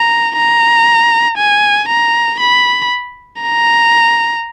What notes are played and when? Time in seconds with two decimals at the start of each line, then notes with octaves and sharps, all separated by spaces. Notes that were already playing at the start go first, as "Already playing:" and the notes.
Already playing: A#5
0.36 A#5
1.37 G#5
1.88 A#5
2.40 B5
3.42 A#5